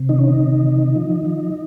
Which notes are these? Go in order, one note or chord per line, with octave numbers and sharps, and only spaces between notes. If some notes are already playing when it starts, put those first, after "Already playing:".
Already playing: C3
D#3 D#4
C#4
D#4
C3
D#3
F3
F3